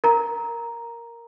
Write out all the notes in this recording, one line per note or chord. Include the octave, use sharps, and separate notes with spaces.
A#4 A#5